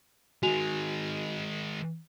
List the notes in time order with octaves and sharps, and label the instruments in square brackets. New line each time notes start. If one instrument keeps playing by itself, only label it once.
[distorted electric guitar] D#3 G#3 [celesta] F#4 G#5 F7